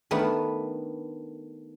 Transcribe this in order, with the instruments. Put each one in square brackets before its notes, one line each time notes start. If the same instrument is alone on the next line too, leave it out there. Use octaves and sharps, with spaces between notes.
[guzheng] D#3 A3 B3 D4